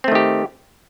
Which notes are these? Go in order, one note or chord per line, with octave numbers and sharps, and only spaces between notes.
D#3 A3 C4 G4